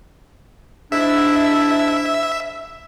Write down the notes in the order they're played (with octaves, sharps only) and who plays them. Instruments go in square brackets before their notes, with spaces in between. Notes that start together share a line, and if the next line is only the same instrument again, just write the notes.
[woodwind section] G#2 D4 E4 [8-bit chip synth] E5